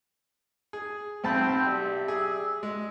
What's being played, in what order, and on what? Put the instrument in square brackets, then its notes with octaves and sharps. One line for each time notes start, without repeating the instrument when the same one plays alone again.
[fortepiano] G#4
[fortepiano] B1 A5 B5 [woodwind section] C4
[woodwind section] G4 D5 E5
[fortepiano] G#4
G#3